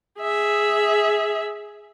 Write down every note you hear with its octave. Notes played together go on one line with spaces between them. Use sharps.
G#4 E5